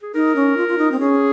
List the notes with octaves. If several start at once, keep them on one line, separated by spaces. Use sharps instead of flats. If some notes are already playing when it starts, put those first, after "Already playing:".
G#4
D#4 A#4
C#4
F4
F4
D#4
C4
C#4 G#4